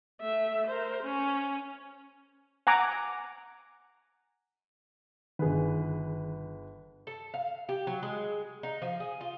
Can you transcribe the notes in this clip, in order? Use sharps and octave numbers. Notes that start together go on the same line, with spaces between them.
A3 E5
A#4 C5
C#4
F#5 G#5 A#5 D6
G1 D#3 G#4 B4
A4
F5
G4
F#3
G#3
D#4
F3
G#4
F4